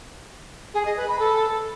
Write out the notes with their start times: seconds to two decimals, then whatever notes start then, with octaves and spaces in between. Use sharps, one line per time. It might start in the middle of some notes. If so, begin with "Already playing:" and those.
0.74 G#4
0.85 D#5
0.97 B4
1.08 B5
1.19 A4